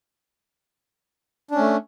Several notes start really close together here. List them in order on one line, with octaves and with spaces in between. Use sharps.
D4 C#4 A3